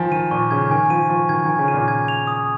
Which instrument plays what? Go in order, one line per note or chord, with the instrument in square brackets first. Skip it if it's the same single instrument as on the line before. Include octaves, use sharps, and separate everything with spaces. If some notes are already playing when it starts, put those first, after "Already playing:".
Already playing: [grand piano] D#3 F3 [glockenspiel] G#5
[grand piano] D#3 [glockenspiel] D#7
[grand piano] A#2 [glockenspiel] C#6
[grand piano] C#3 [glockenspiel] G#6
[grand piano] D#3 [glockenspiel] G#5
[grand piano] F3 [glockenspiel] D#7
[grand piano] F3 [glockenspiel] C#6
[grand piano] D#3 [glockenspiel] G#6
[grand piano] D#3 [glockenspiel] G#5
[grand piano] C#3
[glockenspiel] D#7
[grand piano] A#2
[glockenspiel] G#6
F7
D#6